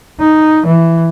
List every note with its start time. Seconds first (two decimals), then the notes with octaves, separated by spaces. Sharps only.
0.19 D#4
0.66 E3